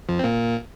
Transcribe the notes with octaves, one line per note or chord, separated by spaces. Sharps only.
F2 F3
C4
A#2 A#3